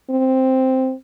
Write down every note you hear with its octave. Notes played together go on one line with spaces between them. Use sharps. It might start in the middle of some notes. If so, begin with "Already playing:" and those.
C4